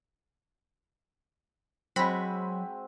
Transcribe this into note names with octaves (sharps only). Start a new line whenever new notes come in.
F#3 G#3 C4 F#4 B5